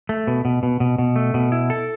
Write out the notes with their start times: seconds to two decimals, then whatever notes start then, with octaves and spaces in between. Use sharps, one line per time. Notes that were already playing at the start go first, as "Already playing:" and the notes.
0.09 A3
0.27 B2
0.45 B2
0.63 B2
0.80 B2
0.98 B2
1.16 A3
1.34 B2
1.52 E4
1.70 A4